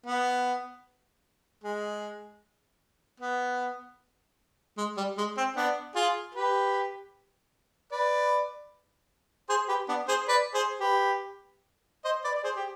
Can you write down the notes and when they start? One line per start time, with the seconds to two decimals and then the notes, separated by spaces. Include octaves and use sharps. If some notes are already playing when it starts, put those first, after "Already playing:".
0.06 B3
1.64 G#3
3.20 B3
4.78 G#3
4.97 G3
5.18 G#3
5.37 C4
5.56 B3 D4
5.96 F4 G#4
6.35 G4 B4
7.92 B4 D5
9.49 G#4 C5
9.69 G4 B4
9.89 B3 D4
10.08 G#4 C5
10.28 B4 D5
10.54 G#4 C5
10.80 G4 B4
12.05 C5 D#5
12.24 B4 D5
12.35 D5
12.44 G#4 C5
12.56 G4